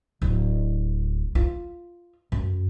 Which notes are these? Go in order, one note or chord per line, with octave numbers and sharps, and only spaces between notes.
D1
F4
F#2